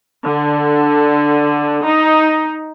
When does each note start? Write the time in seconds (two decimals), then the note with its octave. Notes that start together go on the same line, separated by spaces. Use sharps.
0.24 D3
1.84 D#4